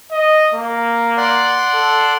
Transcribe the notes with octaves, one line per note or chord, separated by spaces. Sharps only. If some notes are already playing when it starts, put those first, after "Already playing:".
D#5
A#3
D5 F#5 C6
A4